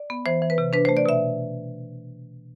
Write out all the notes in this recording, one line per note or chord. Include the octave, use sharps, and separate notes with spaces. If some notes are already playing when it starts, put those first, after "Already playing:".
Already playing: D5
B3
E3 C5
E3
B4
C3
D4 B4
A3 C5
D5
B2 E5